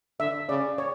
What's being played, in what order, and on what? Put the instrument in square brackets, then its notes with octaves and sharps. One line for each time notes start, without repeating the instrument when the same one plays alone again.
[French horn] D3 [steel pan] E5
[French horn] C#3 [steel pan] D5
[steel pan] C#5